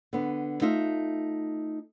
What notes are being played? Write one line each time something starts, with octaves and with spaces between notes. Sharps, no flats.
D3 B3
A3 D#4 F4 E5